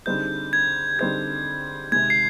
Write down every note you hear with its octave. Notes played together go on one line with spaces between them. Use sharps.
D3 G3 C4 D#4 G#4 G6
G#6
D3 G3 C4 D#4 G#4 G#6
C3 D#3 G#3 G#6
C7